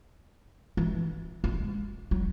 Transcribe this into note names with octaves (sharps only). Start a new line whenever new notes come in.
E3
G#3
F#3